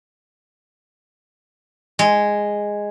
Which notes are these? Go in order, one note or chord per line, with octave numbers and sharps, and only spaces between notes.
G#3